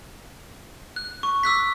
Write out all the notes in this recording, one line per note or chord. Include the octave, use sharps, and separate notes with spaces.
F#6
C#6
D6 E6 F#6 B6